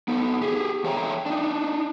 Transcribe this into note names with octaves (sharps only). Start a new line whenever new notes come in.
B3 D#4 A4
G4 G#4
E2 A4 C#5 E5 G5 A#5
D4 D#4